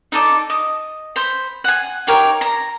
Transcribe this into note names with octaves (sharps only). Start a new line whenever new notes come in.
D#4 A4 D5
D#5
C5 B5
F#5 G#5
D#4 G4 A#4 C#5
A#5